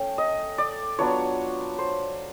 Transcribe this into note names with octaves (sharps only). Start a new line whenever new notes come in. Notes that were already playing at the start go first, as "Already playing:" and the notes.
Already playing: A3 C#4 G5
D#5
D5
F#3 B3 D4 F4 C#5
C5